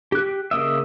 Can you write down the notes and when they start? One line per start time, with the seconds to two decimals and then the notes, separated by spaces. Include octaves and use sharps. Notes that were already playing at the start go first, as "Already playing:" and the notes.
0.12 G4 F#6
0.51 C#3 A#3 D#5 E5